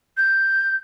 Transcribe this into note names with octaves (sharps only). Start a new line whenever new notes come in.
G6